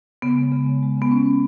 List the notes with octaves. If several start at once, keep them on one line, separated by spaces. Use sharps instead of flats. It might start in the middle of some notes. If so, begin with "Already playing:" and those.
C#3 B3
G#3
C#3
G#3
G#3
C#3 B3
G#3 C#4
G#3